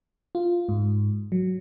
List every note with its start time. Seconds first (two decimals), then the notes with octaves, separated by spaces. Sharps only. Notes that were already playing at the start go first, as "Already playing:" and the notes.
0.35 F4
0.69 G#2
1.32 F#3